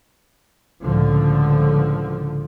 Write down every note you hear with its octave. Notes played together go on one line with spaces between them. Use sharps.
C#2 A2 D3 F3